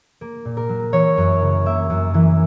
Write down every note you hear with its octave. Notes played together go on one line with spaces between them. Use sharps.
A#3
A#2
A#4
F#3
E3 C#5
F#2
C#3
A#3 E5
F#2
E3